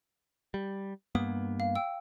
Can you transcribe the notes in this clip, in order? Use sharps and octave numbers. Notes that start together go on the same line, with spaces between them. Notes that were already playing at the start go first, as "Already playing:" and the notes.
G3
G2 A#3 B3 D#6
F5
G5 E6